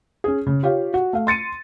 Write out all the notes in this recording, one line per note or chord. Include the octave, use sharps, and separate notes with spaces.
C#4 G#4
C#3
F4 G4 C#5 F5
F#4
A3 F5
C6 A6 C#7 D#7